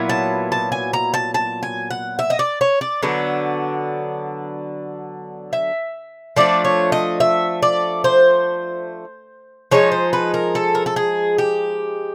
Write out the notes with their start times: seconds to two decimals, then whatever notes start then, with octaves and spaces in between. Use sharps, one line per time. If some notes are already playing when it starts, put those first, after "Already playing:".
Already playing: A#2 F#3 B3 E4
0.09 A5
0.52 A5
0.72 G#5
0.93 A#5
1.14 A5
1.34 A5
1.63 G#5
1.91 F#5
2.19 E5
2.30 D#5
2.39 D5
2.61 C#5
2.81 D5
3.03 D3 F#3 B3 D4
5.53 E5
6.36 F3 A3 D4 D5
6.65 C#5
6.92 D#5
7.20 E5
7.63 D5
8.04 C5
9.71 F3 G#3 D#4 C#5
9.92 C5
10.13 B4
10.34 A#4
10.55 A4
10.75 A#4
10.86 A4
10.96 G#4
11.38 G4